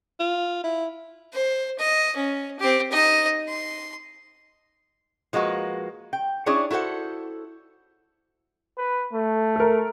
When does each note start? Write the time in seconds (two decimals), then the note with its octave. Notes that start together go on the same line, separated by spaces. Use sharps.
0.20 F4
0.64 E4
1.32 C5
1.79 D#5
2.16 C#4
2.59 C4 G4
2.91 D#4 D#5
3.48 C6
5.33 F3 G#3 A#3 F#4 B4
6.13 G5
6.46 C#4 D4 E4 G#4 C#5 D5
6.71 E4 F#4 A4 C5 F#5
8.78 B4
9.13 A3
9.56 A4 A#4